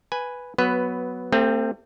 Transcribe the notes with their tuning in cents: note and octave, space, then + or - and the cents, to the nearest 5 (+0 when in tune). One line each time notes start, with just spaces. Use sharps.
B4 +0 G#5 +0
F#3 +0 B3 +0 B4 +15
A3 +40 C4 +0 G4 +45